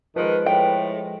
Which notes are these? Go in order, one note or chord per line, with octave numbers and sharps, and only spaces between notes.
D#3 F3 G#3 B4
A2 G5